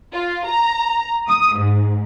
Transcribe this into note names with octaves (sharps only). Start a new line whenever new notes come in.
F4
A#5
D#6
G#2